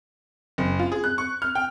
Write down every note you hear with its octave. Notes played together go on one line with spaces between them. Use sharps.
F#1
F4
G#4
F#6
C#6
F6
G5